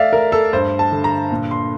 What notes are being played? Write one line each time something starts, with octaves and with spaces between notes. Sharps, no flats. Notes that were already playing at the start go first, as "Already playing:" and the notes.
Already playing: A3 D5 E5 F5
A3 A#4
A4
G2 C5
A5
D3
A#5
A#2
C6